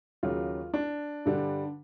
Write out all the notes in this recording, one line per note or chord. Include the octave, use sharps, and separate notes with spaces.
D#2 C#3 F#3 F4
D4
G2 D3 G3